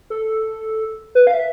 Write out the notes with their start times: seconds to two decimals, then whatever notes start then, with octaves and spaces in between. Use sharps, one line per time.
0.10 A4
1.15 B4
1.27 F5
1.33 E5